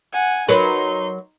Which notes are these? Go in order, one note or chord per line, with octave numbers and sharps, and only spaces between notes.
F#5 G#5
F#3 D#4 A#4 B4 C6